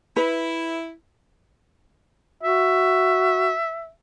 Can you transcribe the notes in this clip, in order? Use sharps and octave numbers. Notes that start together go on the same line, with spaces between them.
E4 B4
F#4 E5